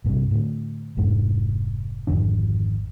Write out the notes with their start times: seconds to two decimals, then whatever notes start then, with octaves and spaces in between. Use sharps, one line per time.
0.04 A#1 G2 C3
0.31 A2 D3
0.97 F1 F2 G#2 G#3
2.07 G#1 F2 D3 D4